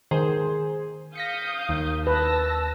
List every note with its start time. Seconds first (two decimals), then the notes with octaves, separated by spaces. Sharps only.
0.11 D#3 G#4 C5
1.15 F5 D#6 G6 A#6 B6 C#7
1.69 D#2
2.07 B4 A5 E6 A#6